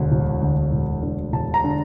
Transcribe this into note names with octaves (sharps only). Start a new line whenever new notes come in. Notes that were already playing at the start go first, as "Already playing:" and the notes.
Already playing: E1 D2 D3
E1
D2 D3
E1
D2 D3
E1 A5
A#5
D3